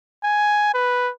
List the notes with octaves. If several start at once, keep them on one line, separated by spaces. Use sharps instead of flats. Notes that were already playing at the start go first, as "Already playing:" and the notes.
G#5
B4